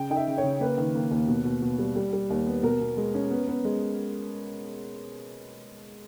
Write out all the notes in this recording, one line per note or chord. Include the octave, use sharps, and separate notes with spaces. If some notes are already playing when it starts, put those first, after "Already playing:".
Already playing: C#3 G5
D#4 G5
E5
C#3
C#5
C#3
A#3 B4
D#3
A#3
D#2
B2
B2
B2
G3
G3
G3
D#2
B3
B2 A#4
B2
G#3
C#4
B3
B3
G#3